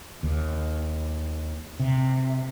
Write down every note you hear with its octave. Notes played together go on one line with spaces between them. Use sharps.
D#2
C3